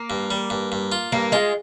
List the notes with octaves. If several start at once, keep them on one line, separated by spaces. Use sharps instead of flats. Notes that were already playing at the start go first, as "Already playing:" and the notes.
Already playing: A#3
G2
G3
G2
G2
F4
G2 A#3
G#3 F4